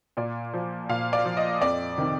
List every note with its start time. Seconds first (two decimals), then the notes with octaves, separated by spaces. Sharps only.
0.17 A#2 D5
0.54 F3
0.89 A#2 F5
1.13 D5
1.25 F3
1.37 D#5
1.61 F2 D5
1.98 C3 D#3